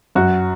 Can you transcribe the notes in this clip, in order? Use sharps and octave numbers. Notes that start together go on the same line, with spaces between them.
F#2 F#4